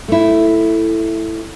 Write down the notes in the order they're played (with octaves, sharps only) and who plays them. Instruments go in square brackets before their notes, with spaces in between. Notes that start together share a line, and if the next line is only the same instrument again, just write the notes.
[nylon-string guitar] A3 E4